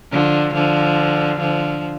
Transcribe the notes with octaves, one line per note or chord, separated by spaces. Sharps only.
D3 F3
D3 F3
D3 F3